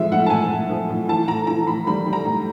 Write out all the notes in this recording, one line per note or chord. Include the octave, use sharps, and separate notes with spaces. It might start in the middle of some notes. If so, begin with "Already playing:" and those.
Already playing: F3 G#3 E5
A2 F#5
A5
A2 G#5
A2
F3
A2
E3 A5
A2 A#5
E3 A#5
A2 B5
G3 B5
G3
A#5
A2